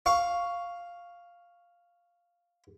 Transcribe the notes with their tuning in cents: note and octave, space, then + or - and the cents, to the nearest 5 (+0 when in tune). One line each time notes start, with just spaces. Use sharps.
F5 +0 C#6 +5